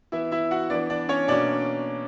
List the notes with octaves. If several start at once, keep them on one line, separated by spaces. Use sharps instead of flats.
E3 B3 E4 E5
E4 E5
F#4 F#5
E3 B3 D4 D5
D4 D5
C#4 C#5
B2 A#3 C#4 D4 D5